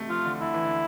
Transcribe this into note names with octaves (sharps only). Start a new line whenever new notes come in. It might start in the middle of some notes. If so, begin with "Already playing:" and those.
Already playing: C3 A3
F3 F4
D3
D3 E4
E3
D3